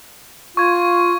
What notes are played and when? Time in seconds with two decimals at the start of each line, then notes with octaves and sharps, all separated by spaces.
0.57 F4 C#6 G#6